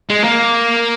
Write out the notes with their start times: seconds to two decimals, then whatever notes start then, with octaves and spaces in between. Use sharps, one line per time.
0.09 G#3
0.24 A#3